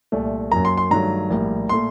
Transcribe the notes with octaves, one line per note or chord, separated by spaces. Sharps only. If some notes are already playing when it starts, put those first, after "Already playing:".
C2 A#2 A3
F#2 F#3 A#3 A#5
C6
C6
G2 D#3 F#3 A3 A#5
A#1 A2 G3 A#3
A#2 A3 C6